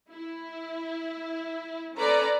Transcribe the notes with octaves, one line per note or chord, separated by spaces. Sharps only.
E4
C#4 A4 B4 D5 A#5